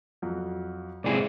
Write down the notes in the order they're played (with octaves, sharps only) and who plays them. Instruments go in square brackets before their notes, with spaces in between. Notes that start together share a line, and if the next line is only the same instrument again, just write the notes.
[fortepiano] F2 F#3
[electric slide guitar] G#2 C3 G#4 [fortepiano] E4 D5